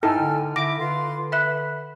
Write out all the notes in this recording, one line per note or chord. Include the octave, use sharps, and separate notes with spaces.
G#2 D#4 E4 A4 G5 G#5 F6
D3
D3 E4 D6 A#6
D3 F4 B4 C6
B4 E5 B5 F#6